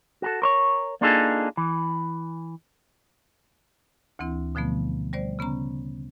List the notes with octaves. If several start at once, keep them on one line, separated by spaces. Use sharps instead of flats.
F#4 G4 A4
A#4 C5 C#5
A#3 D4 D#4 F4 G#4 A4
E3
D2 E3 C4 E4
B2 D3 F3 A3 B3
G3 C5 D5
C#3 B3 C#4 A#5